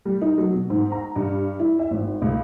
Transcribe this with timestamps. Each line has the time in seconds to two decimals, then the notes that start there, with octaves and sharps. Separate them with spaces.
0.05 G3
0.22 D#4
0.38 F#3
0.53 B2
0.70 G#2
0.92 A#5
1.16 G2
1.59 E4
1.79 E5
1.91 G#1
2.22 C#2